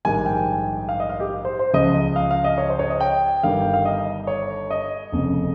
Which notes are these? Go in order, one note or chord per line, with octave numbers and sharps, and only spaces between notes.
A#1 G#2 D#3 G3 G#5
G5
F5
D#5
F5
G4
C5
C5
C#2 C#3 F3 D#5
F5
F5
D#5
C#5
C5
C#5
D#5
G5
G1 G2 D#3 G3 F5
G5
F5
D#5
C#5
D#5
F1 F2 C#3